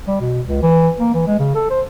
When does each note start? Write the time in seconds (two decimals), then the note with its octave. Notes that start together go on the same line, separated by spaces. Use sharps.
0.07 G3
0.20 B2
0.48 C#2
0.62 E3
1.00 A#3
1.14 E3
1.27 G#3
1.39 C#3
1.55 A4
1.70 C5